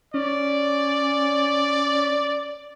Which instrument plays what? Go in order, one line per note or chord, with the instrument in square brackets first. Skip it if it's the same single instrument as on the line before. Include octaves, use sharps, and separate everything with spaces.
[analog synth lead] C#4 [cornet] D5